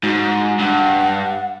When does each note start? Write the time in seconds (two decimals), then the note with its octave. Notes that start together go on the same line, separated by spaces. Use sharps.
0.03 G#2 F#4
0.59 G2 F#5